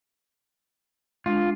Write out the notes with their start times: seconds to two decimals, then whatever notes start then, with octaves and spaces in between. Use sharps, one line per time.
1.26 G#3 D4 F4